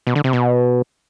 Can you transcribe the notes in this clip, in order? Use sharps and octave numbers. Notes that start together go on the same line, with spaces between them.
B2
D3
C3
B2